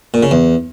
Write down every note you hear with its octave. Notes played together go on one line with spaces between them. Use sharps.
A#2
C#3
E2